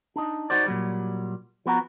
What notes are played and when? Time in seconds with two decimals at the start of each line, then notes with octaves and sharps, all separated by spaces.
0.16 D4 D#4
0.50 D#4 F#4 C5 D5
0.66 A#2 F#3 G3
1.66 F3 B3 F#4 A#5